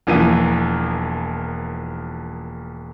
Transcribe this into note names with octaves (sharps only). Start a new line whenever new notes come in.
E1 E3 F3 A#3 D#7